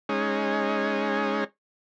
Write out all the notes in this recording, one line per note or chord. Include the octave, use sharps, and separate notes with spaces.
G#3 C#4 D#4